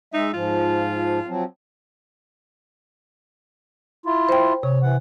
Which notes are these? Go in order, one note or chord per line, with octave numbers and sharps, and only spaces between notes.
G#3 D#4 E5
G#2 F3 F4
F3 F#3 C4
E4 F4
C5 G5
C3 C#5
E3 F#5